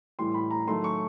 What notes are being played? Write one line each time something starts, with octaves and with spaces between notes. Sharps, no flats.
A2 E3 G3 C6
B5
A#5
D#3 F#3 A3 C6
C#6